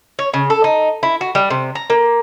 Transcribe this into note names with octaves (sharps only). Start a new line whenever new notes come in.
C#5
C#3
A4
D#4
E4
F#4
G3
C3
A#5
A#3